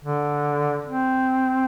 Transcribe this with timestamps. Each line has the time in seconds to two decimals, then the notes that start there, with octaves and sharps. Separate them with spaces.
0.04 D3
0.87 C4